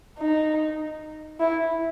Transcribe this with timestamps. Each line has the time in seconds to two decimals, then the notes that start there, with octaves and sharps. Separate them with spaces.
0.19 D#4
1.40 E4